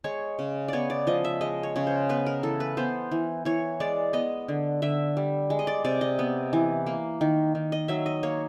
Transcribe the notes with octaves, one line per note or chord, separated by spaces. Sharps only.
G#3 C#5
C#3
B3 C#5 D5
D5
F3 D#5
E5
G#3 D#5
C#5
C#3 C#5
C5
B3 B4
A#4
E3 A4
B4
B3 C5
E3
E3 C#5
G#3 D5
B3 D#5
D3
D3 E5
G3
G#3
D#5
D5
C3 D5
D#5
B3
E3
A#3
D#3
D#3
D#5
F#3 E5
D#5
A#3 C#5